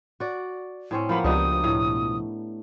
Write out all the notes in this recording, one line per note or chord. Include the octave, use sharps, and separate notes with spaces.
F#4 D5
A2 C4 C#4
F3 A#3 B3 B5
C#2 B2 F3 D4 D#4 G4 D#6
A2